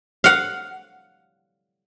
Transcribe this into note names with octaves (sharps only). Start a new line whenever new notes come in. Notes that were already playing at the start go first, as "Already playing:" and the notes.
F5 F#5